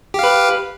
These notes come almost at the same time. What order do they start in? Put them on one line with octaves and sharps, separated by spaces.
G4 F5 B4